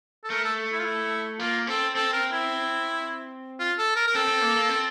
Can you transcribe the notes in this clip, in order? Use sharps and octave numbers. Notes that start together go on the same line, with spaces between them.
A4
A3 A#4
A4
E4
F4
E4
A#3 F4
C4 A4
C4 A4
A#4
E4
F4
A4
A#4
A#4
C4 A4
C4
A#3
A#3
C4